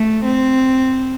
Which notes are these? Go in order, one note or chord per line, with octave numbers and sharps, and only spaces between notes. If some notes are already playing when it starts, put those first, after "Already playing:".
Already playing: A3
C4